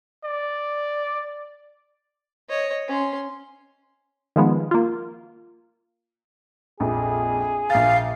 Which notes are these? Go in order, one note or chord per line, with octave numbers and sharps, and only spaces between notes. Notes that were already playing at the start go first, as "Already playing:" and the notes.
D5
C#5 D#5
C#4 C6
D#3 F3 G#3 B3
A#3 F4
A#1 F2 G#4
A#1 F5 A#5 A6